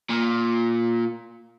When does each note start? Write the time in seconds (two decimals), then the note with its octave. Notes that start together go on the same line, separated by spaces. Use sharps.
0.10 A#2